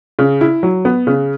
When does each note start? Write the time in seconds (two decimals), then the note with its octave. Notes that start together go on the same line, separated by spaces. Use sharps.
0.19 C#3
0.41 E4
0.63 F#3
0.85 B3
1.07 C#3